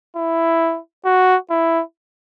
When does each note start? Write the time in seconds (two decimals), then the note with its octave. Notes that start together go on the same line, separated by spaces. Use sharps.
0.16 E4
1.05 F#4
1.50 E4